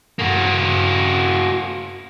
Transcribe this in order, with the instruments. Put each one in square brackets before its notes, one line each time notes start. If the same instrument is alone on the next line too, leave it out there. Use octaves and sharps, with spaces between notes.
[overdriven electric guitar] A#3 F#4